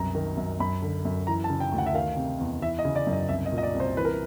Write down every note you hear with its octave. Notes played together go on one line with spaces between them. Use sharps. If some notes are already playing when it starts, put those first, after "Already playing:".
Already playing: C2 F#2 B2 A#5
D#3
F#2
F#2 B5
D3
F#2
E3 A#5
A5
C#3
G5
D2
F#5
E5
D#3 F5
C3
E2
E3 E5
D#5
C#3
D5
F#2
D#5
C2 E5
D#5
A#2
D#5
D5
C2
C5
E3 B4
A#4